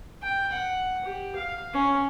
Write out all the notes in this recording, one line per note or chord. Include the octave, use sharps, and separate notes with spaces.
G5
F#5
G4
F5
C#4